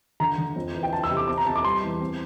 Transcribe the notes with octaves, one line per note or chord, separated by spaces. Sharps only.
D3 A#5
D3
F2
E3
G5
D4 A5
E6
C3
D6
C4 D6
A#5
C4 A5
D6
G3 C6
E2
C4